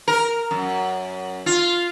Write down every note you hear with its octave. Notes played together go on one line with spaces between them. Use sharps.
A#4
F#2
F4